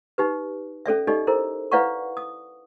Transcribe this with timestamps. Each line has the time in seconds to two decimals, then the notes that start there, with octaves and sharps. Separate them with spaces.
0.18 D#4 G4 B4
0.86 C#4 A4 D5 E5
1.07 D#4 G4 A4 D5 D#5
1.27 E4 A4 A#4 C5
1.72 E4 B4 D5 F5 F#5 C#6
2.17 D#6